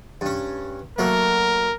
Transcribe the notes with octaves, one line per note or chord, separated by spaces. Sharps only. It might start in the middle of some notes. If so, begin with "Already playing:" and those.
G2 C#4
F#3 A3 A#3 A#4